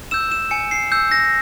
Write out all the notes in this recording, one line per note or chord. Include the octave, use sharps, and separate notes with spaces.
E6 G6 E7
E7
G#5 C#7
C7
E6 G6
A#6